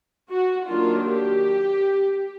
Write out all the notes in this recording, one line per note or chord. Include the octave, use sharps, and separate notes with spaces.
F#4
D#3 F#3 A#3 D4 F4
G4